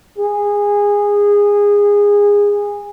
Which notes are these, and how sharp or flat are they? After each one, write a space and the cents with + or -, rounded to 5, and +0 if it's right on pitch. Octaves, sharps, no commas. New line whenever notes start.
G#4 -20